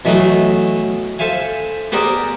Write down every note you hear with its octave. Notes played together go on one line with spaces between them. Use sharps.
B2 E3 F#3 A3 B3
A4 C5 E5 F5 G#5
B3 G4 G#4 A#4 C5 D5